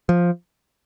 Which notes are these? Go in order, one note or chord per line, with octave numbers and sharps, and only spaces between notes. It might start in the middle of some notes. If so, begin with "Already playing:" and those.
F3